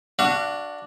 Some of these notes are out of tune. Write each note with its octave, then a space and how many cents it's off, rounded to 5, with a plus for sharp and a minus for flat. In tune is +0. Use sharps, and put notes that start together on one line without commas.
D4 +0 F#4 +0 F5 -40